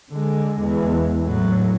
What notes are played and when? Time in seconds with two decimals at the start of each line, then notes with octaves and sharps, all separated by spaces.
0.11 D3 G#3
0.59 E2 G#3
1.24 A2 F#3